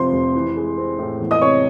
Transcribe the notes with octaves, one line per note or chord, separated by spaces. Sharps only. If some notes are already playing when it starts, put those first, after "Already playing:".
Already playing: F2 C3 F3 C5 C6
F1
E3
G#3
C4
A2
E2
D#5 D#6
C3 C#5 C#6